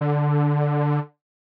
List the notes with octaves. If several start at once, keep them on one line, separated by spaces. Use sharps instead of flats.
D3